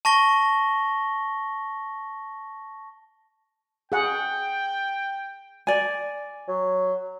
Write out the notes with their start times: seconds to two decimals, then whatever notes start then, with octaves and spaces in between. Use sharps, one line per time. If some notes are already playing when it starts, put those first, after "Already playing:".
0.05 A5 C#6 A#6 G7
3.92 G#4 F#5 G5
5.67 D5 G#5
6.48 F#3